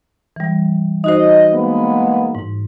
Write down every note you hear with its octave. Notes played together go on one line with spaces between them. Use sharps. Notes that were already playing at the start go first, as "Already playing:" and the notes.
E3 G3
D#4 F#4 C5 D#5
G#3 A#3 B3
G#2